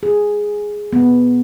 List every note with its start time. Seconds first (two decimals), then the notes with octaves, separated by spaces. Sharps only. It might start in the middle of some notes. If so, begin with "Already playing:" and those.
0.03 G#4
0.93 B3